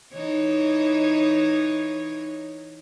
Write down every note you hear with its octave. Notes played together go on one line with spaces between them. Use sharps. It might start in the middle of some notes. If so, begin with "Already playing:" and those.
E3 D#4 C#5